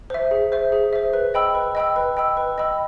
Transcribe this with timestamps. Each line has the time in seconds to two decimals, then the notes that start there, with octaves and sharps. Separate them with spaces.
0.10 C5 E5
0.31 G#4
0.52 C5 E5
0.72 G#4
0.93 C5 E5
1.14 B4
1.34 D#5 G5 B5 E6
1.55 B4
1.75 D#5 G5 B5 E6
1.96 B4
2.17 D#5 G5 B5 E6
2.37 B4
2.58 D#5 G5 B5 E6